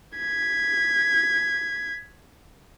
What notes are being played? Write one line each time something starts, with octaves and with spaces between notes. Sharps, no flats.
G#6 B6